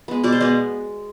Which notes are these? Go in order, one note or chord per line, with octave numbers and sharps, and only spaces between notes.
G#3 B3
B2 D5
C5
G#3 B3 D5